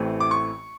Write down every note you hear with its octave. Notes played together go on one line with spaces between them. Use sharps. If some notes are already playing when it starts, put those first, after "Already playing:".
Already playing: A1 A2 E3 A3 C4
D6
C#6